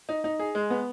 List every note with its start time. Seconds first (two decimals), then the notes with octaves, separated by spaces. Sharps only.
0.09 D#4
0.24 D#4
0.39 G#4
0.55 G#3
0.70 B3